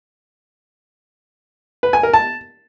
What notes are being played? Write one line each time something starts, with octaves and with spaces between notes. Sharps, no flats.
B4
G#5
A#4
A5